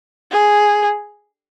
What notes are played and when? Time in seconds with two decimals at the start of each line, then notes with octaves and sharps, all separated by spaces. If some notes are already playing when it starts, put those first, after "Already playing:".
0.32 G#4